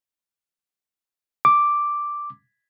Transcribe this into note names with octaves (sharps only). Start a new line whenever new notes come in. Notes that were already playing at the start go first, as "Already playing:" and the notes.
D6